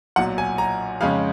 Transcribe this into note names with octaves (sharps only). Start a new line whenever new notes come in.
B1 A#2 F#3 F#5
G#5
A#5
F2 C#3 G#3 C#4 F5